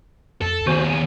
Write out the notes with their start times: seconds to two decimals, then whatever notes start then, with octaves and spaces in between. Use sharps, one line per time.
0.41 F2 A4
0.67 D#2 B3 F#4 C5 G#5
0.90 G#5